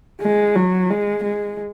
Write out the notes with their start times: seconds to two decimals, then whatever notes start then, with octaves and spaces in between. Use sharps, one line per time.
0.22 G#3
0.55 F#3
0.90 G#3
1.24 G#3